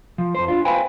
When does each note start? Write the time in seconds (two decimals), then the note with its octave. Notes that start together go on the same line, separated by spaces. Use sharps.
0.18 F3
0.35 F2 C5
0.48 D4 F4
0.65 B4 C5 F5 G5 G#5 B5